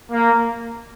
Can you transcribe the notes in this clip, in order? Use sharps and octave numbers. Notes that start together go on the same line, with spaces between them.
A#3